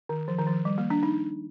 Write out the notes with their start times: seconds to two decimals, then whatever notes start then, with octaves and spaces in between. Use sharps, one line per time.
0.09 D#3
0.28 F3
0.39 D#3
0.47 F3
0.65 G3
0.78 A#3
0.90 D4
1.03 D#4